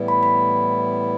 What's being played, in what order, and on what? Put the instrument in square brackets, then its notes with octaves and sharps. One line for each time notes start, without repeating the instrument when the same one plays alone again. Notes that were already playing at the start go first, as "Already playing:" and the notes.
Already playing: [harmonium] A2 E3 G3 B3 E4
[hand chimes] B5
B5